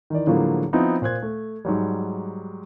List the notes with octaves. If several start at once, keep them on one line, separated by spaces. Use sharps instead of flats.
D#3 E3 D5
A2 D3 F3 F#3 G#3 A#3
F3 B3 C4 D#4 E4
A#2 C5 F#6 G#6
A3
G#2 F#3 G3